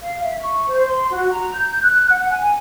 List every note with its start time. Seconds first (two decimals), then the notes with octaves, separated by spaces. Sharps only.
0.01 F5
0.22 E5
0.40 C#6
0.67 C5
0.86 C6
1.10 F#4
1.31 A#5
1.53 G6
1.82 F#6
2.09 F#5
2.31 G#5